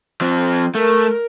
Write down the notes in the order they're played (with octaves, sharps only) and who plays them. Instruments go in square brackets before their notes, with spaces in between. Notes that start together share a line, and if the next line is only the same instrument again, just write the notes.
[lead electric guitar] F3 C4
[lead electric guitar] A3 [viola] A#4